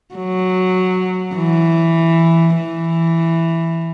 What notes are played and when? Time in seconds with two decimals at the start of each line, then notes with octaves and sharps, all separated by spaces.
0.15 F#3
1.36 E3
2.57 E3